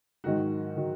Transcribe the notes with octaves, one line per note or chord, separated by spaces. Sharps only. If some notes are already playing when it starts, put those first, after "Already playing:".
G#2 D#3 F#3 F#4
D#3 F#3